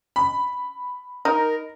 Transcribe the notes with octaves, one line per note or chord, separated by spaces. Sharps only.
B5
D#4 A#4